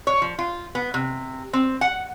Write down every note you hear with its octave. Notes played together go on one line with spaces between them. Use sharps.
C#5
F3
F4
B3
C3
C4
F#5